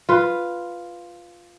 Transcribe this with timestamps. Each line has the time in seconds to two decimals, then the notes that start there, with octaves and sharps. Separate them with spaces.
0.09 F4 B4